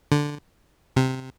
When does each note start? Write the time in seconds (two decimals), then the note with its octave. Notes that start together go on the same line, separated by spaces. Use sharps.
0.12 D3
0.96 C3